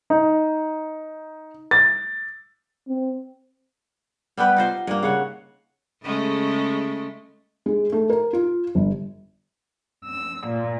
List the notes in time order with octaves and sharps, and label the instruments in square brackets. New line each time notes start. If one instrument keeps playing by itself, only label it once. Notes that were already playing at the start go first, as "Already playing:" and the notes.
[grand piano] D#4
A6
[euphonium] C4
[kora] G3 B3 G4 B4
D#4 F4 C5
G2 A#3
C#3 C#5 F#5
[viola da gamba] C#3 G#3 A3
[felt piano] G#3
A3
A#4
F4
G1
[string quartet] E6
A#2